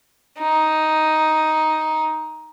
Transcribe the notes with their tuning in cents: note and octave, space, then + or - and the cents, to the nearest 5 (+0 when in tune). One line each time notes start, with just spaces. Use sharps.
D#4 +5